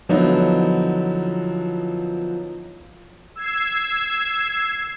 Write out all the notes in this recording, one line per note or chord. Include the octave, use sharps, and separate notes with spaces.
D3 F3 F#3 B3 D#4 E4
E6 G#6 C7